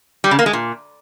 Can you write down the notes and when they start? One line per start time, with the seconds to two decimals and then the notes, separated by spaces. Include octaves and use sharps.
0.24 G3
0.31 C#3
0.39 A#3
0.46 G#3
0.53 A#2